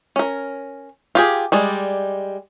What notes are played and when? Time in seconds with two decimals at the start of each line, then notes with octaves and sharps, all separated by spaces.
0.16 C#4 A#4
1.15 F4 G4 G#4
1.52 G3 G#3 D5